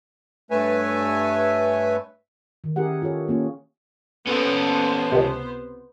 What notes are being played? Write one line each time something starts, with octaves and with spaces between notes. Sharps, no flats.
G2 A3 B4 C#5 E5 G#5
D#3
C#4 E4 G4 G#4 A#4 F#5
F4 G#4 A4 C#5
A#3 C#4 F4
B3 C#4 A4 C5
C#2 C3